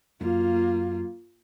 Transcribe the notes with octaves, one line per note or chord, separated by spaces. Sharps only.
F#2 A#3 F4